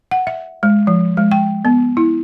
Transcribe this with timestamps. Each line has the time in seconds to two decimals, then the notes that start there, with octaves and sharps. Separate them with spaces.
0.11 F#5
0.27 E5
0.63 G#3
0.87 F3
1.17 G#3
1.32 G5
1.65 B3
1.97 E4